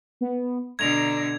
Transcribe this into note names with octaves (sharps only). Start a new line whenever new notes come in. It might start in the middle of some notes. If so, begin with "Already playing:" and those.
B3
B2 D3 A#5 G#6 F7